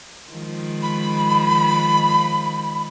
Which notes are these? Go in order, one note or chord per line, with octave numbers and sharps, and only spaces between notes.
D#3 F3 G#3
B5